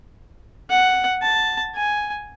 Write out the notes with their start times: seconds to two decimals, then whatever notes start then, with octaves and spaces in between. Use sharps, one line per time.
0.70 F#5
1.22 A5
1.75 G#5